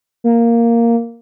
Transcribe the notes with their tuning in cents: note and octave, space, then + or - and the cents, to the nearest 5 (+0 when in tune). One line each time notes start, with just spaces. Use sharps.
A#3 -5